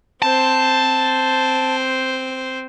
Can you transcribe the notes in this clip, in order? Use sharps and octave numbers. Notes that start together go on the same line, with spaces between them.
C4 C5 A5